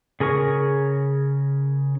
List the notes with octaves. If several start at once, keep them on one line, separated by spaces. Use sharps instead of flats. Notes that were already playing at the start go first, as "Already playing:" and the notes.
C#3 G#4 A#4 C#6